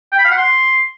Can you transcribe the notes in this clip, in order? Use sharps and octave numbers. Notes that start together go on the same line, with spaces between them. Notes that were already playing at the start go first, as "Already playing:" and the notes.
G5
B5
F5
F#5
C6